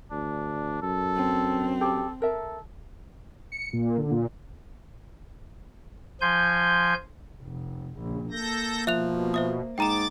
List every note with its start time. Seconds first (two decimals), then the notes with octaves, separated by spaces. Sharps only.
0.11 D2 D4
0.82 F#2 A4
1.16 C4
1.81 G4 A4
2.22 A4 A#4 E5
3.52 C#7
3.73 A#2
3.98 D3
4.11 A#2
6.21 F3 G#5 C6 G6
7.42 F1
7.98 A#1 C#3
8.31 A#3 A4 G6 A#6
8.87 B2 F3 E5 F#6 F7
9.34 C5 E5 D#6
9.78 G#2 G5 A#5 D6 A6 E7